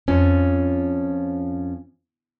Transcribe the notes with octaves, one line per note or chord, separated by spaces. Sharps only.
F2 F3 C#4